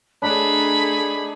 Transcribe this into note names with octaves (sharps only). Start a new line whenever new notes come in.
A3 D4 D#4 G#4 A5 B5